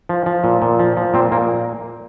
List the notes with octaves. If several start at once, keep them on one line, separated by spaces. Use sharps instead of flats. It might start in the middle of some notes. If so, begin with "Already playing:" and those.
F3
F3
A#2
A#2
F3
F3
A#2 C4
A#2 A#3